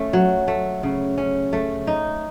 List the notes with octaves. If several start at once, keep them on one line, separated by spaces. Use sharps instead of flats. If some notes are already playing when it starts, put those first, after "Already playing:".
Already playing: A3 C#4
F#3
A3
C#3
C#4
A3
D#4